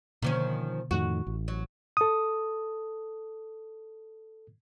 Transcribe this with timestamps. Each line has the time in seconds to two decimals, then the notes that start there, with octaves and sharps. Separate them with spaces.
0.22 B2 D3 D#3 F3 A#3 C#4
0.91 F2 A2 D#3 F#4
1.27 A1
1.48 F#3
1.97 A4 D#6